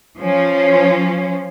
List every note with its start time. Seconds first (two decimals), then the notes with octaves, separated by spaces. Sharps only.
0.19 F3 C#4